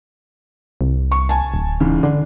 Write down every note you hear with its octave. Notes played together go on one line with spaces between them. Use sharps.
C2
C#6
G#5 A5
D1
E2 G#2 C#3
D3 D4